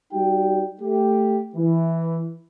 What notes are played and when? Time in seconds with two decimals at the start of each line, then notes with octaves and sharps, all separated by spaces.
0.13 G3 D#4 F#4 G5
0.81 A3 G4
1.56 E3